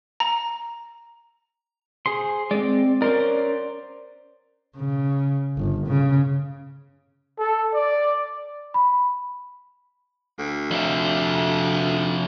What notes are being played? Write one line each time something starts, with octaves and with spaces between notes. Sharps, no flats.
A#5
G#4 C5 C6
G#3 C4 D5
C#4 A#4 C5 D5
C#3
G1
C#3
A4
D5
B5
D2
F2 C3